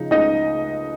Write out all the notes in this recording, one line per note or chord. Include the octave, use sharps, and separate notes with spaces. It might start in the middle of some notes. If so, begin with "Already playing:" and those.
Already playing: C#3 F3 D#4
C#2 D#4 D#5